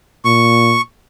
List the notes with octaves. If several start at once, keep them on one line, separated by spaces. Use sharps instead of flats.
A#2 C#6